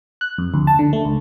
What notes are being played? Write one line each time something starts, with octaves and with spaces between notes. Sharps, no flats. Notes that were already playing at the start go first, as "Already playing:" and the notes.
F#6
F2
D2
A5
D3
A3
C#2